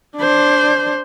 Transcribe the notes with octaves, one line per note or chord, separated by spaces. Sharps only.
D4 C5